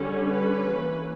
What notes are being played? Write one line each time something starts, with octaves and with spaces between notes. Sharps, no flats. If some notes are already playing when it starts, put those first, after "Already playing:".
Already playing: D3 G3 C#4
B4
E3 A#3 C#4